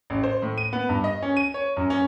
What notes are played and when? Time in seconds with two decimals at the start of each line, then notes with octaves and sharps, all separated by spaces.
0.10 A1
0.24 C5
0.42 A2
0.58 D#7
0.73 B3
0.89 G2
1.04 D#5
1.22 C#4
1.37 D#7
1.54 C#5
1.77 F#2
1.90 C#4